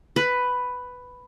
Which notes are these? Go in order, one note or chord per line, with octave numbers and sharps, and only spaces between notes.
B4